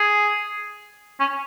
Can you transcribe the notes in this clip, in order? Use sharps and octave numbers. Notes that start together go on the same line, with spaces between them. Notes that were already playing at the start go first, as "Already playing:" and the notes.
Already playing: G#4
C#4